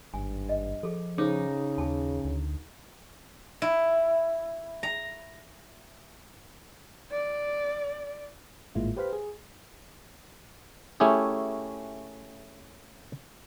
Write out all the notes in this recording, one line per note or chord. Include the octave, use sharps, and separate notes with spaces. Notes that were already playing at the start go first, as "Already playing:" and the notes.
G#1 G2 G#5
D#5
F3 G#4 A4
C#3 D#4 G#4 C5 D6
D#2 G#4 G#5 A5
D2
E4
A#5
D5
G#1 A2 G#3 A#3 E4 F4
G4 B4 C5 F5 G5 B5
G#4
A3 C#4 E4 G4 G#4